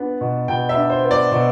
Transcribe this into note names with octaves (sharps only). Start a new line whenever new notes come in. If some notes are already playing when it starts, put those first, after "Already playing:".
Already playing: B3 D4
B2
B2 G5
E5
D4
C5
B3
D5
B2